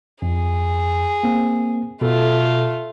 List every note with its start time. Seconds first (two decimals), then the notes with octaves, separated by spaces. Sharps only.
0.22 F2 G#4
1.23 A#3 C4
2.01 B2 A3 F4 A4